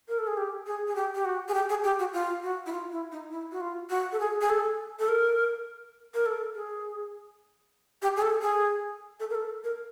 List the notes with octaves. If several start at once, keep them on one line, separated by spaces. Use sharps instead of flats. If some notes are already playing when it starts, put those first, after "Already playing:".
A#4
A4
G#4
G4
G#4
G#4
G4
G4
F#4
G#4
G4
G#4
G4
F#4
F4
F#4
E4
F4
E4
D#4
E4
F#4
F4
F#4
A4
G#4
G#4
A4
A4
A#4
A#4
A4
G#4
G4
G#4
A4
G#4
A4
A#4
A4
A#4